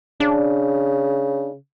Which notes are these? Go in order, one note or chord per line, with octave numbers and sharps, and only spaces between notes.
C#3 D4